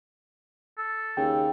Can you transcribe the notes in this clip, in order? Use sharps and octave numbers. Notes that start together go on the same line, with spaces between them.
A4
D#2 C#3 G5